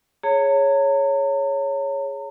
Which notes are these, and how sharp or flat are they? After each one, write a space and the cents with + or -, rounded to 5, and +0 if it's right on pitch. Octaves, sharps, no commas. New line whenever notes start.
G#4 +0 C#5 +0 A#5 -40